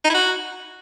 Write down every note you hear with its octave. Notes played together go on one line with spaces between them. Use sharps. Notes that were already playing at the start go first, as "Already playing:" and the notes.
D#4
E4
F#4